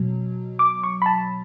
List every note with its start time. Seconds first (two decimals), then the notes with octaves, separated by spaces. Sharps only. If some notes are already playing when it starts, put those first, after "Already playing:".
Already playing: B2 F#3
0.59 D6
0.83 C#6
1.02 B5
1.06 A5